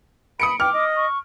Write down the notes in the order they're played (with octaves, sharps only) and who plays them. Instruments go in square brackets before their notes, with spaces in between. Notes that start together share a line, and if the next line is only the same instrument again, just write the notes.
[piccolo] B5 [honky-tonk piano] D#6 C#7 D7
[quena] G5 [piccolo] D6 [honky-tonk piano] F6
[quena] D#5
[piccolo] C#6